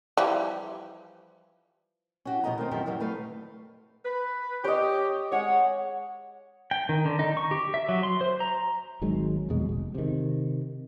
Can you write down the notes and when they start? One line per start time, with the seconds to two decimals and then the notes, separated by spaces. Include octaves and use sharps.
0.17 E3 F3 G3
2.25 C#4 F#4 G4
2.44 B2 F3 A#3 B3 D#5 A#5
2.58 D#3 A3 C4
2.71 F#2 D#3 F3 G4 E5
2.86 D#3 E3 F#3 G3
3.00 A3 B4 F5
4.05 B4
4.64 G4 C#5 D#5
5.32 G#3 C#5 F#5
6.71 G5
6.89 D#3
7.05 D3
7.19 D#4
7.37 C#6
7.51 G4
7.74 E5
7.89 F#3
8.03 C6
8.21 C5
8.40 A#5
9.02 G#1 D#3 F#3 G#3
9.49 A#1 E2 B2 G#3
9.69 F1
9.94 C3 D#3